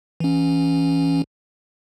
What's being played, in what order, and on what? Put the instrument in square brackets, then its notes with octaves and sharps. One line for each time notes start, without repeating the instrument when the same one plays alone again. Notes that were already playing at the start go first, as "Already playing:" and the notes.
[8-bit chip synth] E3 C#4